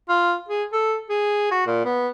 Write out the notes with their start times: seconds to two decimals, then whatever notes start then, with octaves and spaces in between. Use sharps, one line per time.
0.09 F4
0.49 G#4
0.73 A4
1.09 G#4
1.51 F#4
1.66 A#2
1.85 B3